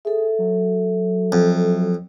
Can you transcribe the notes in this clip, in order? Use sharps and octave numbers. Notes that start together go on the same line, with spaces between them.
G#4 A4 E5
F#3
F2